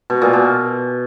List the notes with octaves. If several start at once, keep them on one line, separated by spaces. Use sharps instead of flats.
B2
A#2
B2